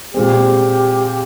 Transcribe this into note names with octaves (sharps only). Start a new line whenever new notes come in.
A#2 G#3 C4 G4